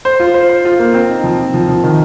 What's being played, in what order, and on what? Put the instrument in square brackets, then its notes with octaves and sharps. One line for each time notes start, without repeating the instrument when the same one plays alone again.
[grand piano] C5
F4
C5
C5
F4
A#3
C4
D#4
F3
F3
F3
F3
D#3